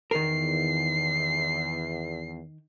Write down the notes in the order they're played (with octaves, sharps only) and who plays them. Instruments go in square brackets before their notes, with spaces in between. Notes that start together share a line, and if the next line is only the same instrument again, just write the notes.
[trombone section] E2 [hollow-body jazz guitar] D#3 A#4 [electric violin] C7